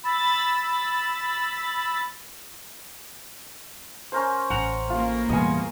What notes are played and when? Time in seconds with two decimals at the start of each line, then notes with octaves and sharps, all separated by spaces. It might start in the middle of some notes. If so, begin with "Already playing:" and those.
0.04 B5 E6 A6
4.12 C#4 A#4 C5
4.50 A1 F#5 A#5
4.90 A2 A#3 F4
5.29 E2 B2 G3 B3 D#5 G#5